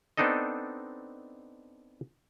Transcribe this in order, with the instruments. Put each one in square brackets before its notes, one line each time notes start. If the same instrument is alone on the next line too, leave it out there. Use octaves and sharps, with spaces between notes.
[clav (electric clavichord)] B3 C4 D4 D#4 A4 D#5